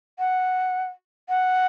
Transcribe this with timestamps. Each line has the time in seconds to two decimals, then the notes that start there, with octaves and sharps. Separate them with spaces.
0.19 F#5
1.29 F#5